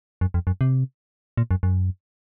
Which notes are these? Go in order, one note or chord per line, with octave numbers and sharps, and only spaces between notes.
F#2
F2
F#2
C3
A#2
F#2
F#2